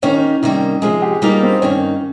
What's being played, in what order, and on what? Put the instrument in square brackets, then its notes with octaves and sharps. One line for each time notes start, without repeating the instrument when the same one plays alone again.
[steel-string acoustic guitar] D#3 A#3 D#4 G4 [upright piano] C#4
[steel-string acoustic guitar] C3 D#3 G3 A#3 [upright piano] D#4
[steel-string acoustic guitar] C3 F3 G#3 [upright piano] G#4
[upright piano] G4
[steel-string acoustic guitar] G3 A#3 F4 A#4 F5 [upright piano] D#4
[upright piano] C4
[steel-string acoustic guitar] G2 D#3 A#3 D#4 [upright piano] C#4